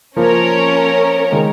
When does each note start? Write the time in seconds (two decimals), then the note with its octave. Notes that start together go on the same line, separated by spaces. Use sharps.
0.16 F3 A#3 C#4 A#4 C#5
1.32 D#3 G#3